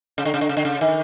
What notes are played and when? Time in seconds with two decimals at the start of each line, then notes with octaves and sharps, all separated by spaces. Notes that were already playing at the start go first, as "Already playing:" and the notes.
0.18 C#3
0.25 D3
0.34 C#3
0.41 D3
0.49 C#3
0.57 D3
0.65 C#3
0.81 D#3